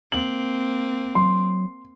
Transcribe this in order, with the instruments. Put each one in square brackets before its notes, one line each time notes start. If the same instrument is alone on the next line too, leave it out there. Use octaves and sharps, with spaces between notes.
[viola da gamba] A#3 C4 [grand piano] F#7
[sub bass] F#3 [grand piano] C6